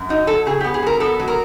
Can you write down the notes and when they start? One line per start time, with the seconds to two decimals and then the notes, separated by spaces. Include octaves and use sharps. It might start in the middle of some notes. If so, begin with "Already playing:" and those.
Already playing: F#2
0.09 F#3 D#4
0.27 F#3 A4
0.46 C#3 G#4
0.60 B3 G4
0.74 G#4
0.82 F#3 A#4
1.00 B3 A4
1.20 F#3
1.28 A#4